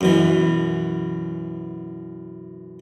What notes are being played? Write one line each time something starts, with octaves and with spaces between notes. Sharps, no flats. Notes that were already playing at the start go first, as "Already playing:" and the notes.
F#2 B2 E3